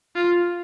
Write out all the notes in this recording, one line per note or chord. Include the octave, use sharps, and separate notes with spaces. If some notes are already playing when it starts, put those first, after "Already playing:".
F4